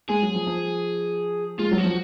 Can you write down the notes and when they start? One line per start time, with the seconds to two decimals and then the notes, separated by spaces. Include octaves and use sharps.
0.09 G#3 G#4
0.22 F#3
0.35 F3
0.47 F3
1.59 G#3 F4
1.72 F#3
1.78 F#4
1.84 F3